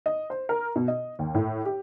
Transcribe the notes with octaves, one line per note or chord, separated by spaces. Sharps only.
D#5
C5
A#4
B2
D#5
D#2
A2
G4